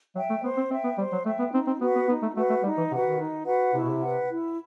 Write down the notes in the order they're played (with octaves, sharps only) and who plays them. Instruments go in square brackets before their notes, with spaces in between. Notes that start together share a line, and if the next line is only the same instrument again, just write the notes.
[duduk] F#3 [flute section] E5 G5
[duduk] A3
[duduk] B3 [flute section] C5
[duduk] C4
[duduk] C4 [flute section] E5 G5
[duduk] B3
[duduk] G3 [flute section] C5
[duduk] F#3
[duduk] A3 [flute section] E5 G5
[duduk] B3
[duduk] C4 [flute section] D#4
[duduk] C4
[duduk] B3 [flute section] F#4 B4 F#5
[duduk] B3
[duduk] B3 [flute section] D#4
[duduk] A3
[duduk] A3 [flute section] F#4 B4 F#5
[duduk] A3
[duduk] G3 [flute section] D#4
[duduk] E3
[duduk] C3 [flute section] F#4 B4 F#5
[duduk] D#3
[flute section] D#4
F#4 B4 F#5
[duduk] C3 [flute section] E4
[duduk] B2
C3
[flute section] B4 F#5
E4